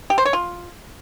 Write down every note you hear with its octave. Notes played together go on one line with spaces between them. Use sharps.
G4
C5
C#5
F4